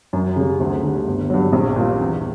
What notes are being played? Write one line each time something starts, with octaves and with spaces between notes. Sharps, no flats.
F#2
C#3 G3
D2
D3 G3
G1
G2 F#3
A#1
A#2 G3
E2